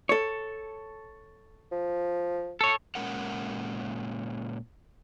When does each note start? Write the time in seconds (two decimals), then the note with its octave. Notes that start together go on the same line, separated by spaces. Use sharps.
0.09 A4 C#5
1.72 F3
2.61 A4 C#5
2.95 A#2 G#3 C#4 A#4 F#5